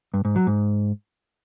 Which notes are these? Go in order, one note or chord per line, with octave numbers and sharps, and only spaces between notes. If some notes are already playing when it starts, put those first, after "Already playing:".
G2
G#2
F#3
G#2